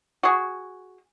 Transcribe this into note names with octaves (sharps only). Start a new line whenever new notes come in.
F#4 G#4